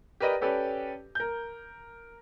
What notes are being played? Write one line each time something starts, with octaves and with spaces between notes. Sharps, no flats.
G4 A#4 B4 D5 D#5
C#4 G4 A4 B4 D5
A#4 G6